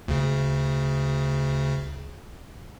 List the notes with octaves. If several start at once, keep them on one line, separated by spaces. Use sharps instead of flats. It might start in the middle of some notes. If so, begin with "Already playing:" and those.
D2 C#3